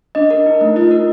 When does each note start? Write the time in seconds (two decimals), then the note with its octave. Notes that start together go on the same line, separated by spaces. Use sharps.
0.15 D4 D#5
0.30 A#4
0.46 D#4
0.61 A3
0.76 F4 D#5
0.91 A#4